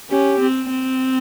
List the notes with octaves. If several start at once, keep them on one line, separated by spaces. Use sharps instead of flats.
C#4 G4
C4
C4